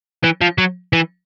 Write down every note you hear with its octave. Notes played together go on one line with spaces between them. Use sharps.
E3
F3
F#3
E3